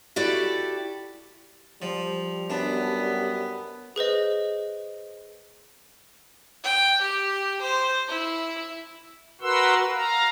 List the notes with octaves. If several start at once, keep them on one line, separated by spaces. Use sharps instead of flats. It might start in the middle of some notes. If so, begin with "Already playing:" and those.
E4 F#4 G4 A4 D5 E5
F3 G3
F#2 B3 D4
G#4 B4 C5 D#5
G5
G4
C5
E4
F#4 A#4 B4 F#5 C6 E6
F5 A#5